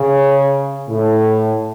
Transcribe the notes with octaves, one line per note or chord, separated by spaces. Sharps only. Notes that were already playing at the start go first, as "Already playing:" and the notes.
Already playing: C#3
A2